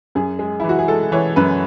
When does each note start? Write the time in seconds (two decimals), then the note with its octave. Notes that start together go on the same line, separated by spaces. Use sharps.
0.15 F#2 G#4
0.39 G#3
0.60 E3 E4
0.69 F#4
0.79 G#4
0.88 G#3 A4
1.12 E3 C#5
1.36 F#2 B4